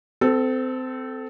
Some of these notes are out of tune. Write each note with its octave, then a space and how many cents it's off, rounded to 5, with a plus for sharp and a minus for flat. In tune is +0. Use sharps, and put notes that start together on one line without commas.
C4 -25 A4 +0